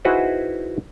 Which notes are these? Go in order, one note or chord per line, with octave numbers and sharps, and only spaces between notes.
D#4 E4 F#4 G#4 B4 C5